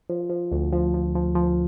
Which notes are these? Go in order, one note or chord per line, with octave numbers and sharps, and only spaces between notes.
F3
F3
D2
F3
F3
F3
F3